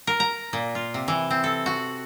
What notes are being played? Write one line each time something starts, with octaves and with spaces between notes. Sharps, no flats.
A#4
A#5
A#2
F4
C3
E3
C4
A4
F#4